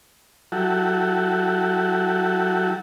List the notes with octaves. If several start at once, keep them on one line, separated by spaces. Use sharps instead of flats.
F#3 E4 F#4 G4 A4